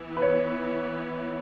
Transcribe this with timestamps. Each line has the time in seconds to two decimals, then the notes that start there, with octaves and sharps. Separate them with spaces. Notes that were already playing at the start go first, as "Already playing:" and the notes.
Already playing: E3 B3 E4
0.17 B4
0.22 C#5